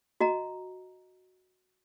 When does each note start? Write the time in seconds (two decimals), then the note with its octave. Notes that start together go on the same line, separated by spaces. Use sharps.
0.20 F#4 D#5 A#5